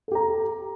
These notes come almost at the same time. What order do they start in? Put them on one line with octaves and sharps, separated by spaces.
A4 G4 A#5